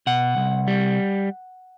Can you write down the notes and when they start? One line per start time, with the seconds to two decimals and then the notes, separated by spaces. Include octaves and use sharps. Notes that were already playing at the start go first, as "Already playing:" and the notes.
0.07 B2 F#5
0.37 C2
0.68 G3